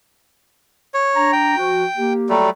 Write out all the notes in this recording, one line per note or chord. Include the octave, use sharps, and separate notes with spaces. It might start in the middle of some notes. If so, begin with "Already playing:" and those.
C#5
D4 A#5
G5
F3 F#4
A#3 G4
F#3 G3 A3